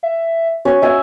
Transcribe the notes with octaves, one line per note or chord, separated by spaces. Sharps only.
E5
C#4 F#4
F#4 E5 G#5